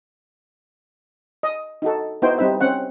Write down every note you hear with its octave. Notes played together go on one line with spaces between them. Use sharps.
D#5
D#4 F#4 A4
B3 D#4 E4 F#4 C5 G5
G3 C4 D#4 B4 E5
C4 C#4 F#5